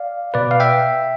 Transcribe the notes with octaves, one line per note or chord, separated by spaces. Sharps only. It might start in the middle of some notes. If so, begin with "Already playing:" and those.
Already playing: D5 F5
B2 B4 D5
F5
E5 G5